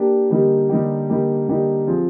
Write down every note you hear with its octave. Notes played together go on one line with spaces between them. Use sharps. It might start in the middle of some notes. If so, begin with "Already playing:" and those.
Already playing: A#3 D4 G4
D3 G3 A#3 D#4 G4
D3 G3 A#3 D#4 G4
D3 G3 A#3 D#4 G4
D3 G3 A#3 D#4 G4
F3 C4 F4 G#4